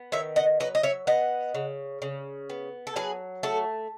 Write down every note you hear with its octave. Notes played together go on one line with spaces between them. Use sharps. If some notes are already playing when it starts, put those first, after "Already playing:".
Already playing: B3
D#3 C#5 E5
D#5 F#5
F#3 B4 D#5
D#5
C#5 E5
B3 D#5 F#5
C#3
C#3
B3
A4
F#3 G#4 B4
A3 F#4 A4